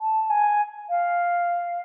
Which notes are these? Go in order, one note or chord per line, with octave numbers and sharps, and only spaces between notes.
A5
G#5
F5